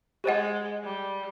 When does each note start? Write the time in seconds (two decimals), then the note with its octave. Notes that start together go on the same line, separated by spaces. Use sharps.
0.24 G#3 G4 C5 D#5 F#5
0.84 G3